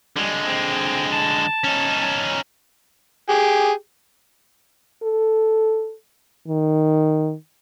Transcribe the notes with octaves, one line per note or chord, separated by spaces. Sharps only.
D3 G3 G#3
C4
A5
C#4 D#4
G4 G#4
A4
D#3